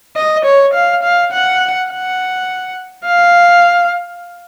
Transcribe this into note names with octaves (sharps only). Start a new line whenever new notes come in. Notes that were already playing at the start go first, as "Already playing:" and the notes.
D#5
C#5
F5
F5
F#5
F#5
F5